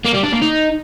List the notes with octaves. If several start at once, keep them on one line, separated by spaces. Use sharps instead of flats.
A#3
G3
D4
A#3
D#4